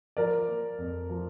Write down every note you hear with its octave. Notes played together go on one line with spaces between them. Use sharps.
F3 A#4 D5
A#3
F2
F3